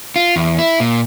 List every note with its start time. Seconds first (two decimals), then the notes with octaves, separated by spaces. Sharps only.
0.16 F4
0.36 E2
0.58 E4
0.80 A#2